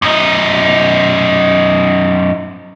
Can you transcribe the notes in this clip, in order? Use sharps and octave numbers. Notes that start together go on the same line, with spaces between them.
F#2 D#4